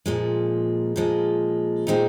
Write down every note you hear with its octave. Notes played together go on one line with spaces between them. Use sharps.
A#2 F3 G#3
A#2 F3 G#3
A#2 G#3 C4 D#4